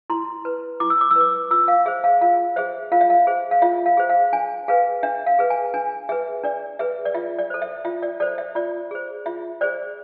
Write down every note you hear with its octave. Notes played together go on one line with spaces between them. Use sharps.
E4 C6
B4
E4 D6
E6
D6
E6
B4 D6
F4 E6
F5
G#4 C5 E5
F5
F4 F5
G#4 C5 E5
F4 F5
E5
F5
G#4 C5
F5
F4 E5
F5
G#4 C5
F5
D4 G#5
G#4 B4 F5
D4 E5
F5
G#4 B4
G#5
D4 G#5
G#4 B4 E5
D4 D5
G#4 B4 E5
D5
F4 E5
D5
A4 C5
E5
F4 E5
D5
A4 C5 D5
E5
F4 D5
G#4 C5
F4 E5
G#4 C5 D5